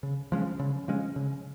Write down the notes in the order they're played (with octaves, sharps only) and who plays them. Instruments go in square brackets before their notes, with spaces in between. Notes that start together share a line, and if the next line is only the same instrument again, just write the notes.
[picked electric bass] C#3
F3 G#3 C#4
C#3
F3 G#3 C#4
C#3